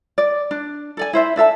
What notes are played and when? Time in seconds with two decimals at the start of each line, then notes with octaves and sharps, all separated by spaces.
0.18 D5
0.51 D4
0.97 A4 D5 G#5
1.13 E4 C5 E5
1.36 D4 A4 E5 A5